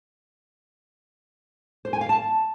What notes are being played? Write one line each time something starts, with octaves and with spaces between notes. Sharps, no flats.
C5
G#5
F5
A5